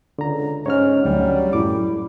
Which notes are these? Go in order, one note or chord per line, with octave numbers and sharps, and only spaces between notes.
C#2 D3 A#5
G#2 C#4 C#5 F6
D2 F#3 G3
F#2 A2 E4 D6